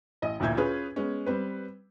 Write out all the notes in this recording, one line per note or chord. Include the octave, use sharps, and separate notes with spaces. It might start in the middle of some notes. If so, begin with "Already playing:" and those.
A1 D#5
A1 D2 A#2 E5 G6 G#6
C#4 F4 G#4 B4
G#3 B3 C#4
G3 C4 B4